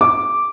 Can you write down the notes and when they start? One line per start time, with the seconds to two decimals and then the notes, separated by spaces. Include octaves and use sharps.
0.01 D6